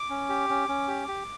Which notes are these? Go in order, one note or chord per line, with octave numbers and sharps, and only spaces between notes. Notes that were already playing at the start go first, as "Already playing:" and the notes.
Already playing: D6
C#4
G4
C#4
C#4
G4
G4